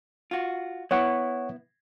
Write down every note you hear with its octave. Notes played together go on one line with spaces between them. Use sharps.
F4 F#4
B3 E4 C#5 F#5 C#6